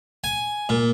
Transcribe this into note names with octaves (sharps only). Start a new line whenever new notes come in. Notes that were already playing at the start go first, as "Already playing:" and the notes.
G#5
A#2